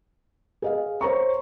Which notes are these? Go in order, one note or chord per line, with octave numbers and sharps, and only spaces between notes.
G#4 D#5 F5
C5 C#5 A#5 C#6